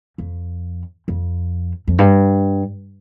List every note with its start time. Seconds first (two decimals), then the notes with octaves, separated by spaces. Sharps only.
0.18 F2
1.08 F2
1.88 F2
1.99 G2